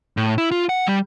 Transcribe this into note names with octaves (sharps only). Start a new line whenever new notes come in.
A2
E4
F4
F#5
G3